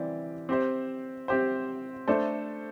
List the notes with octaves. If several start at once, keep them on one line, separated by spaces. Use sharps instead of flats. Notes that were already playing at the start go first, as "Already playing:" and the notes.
Already playing: E3 G3 C4 G4 D5
C4 G4 C5
C4 G4 C5
A3 D4 A4 C5